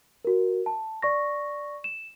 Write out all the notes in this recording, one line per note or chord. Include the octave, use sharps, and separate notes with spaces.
F#4 A#4
A5
D5 C#6 A#6
E7